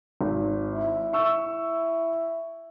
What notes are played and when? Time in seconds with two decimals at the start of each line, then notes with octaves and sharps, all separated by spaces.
0.21 G#1
0.75 E4
1.13 E5 C#6 E6